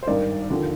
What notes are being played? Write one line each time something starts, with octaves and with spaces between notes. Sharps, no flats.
C5
G#1 G2 D#3 A#4 D5
D#2 D3 F3